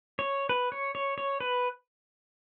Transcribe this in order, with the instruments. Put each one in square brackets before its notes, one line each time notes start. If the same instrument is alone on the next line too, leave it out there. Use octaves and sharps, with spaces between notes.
[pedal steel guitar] C#5
B4
C#5
C#5
C#5
B4